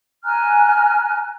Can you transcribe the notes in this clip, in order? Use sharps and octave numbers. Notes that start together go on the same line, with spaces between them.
G#5 A#5 F6 F#6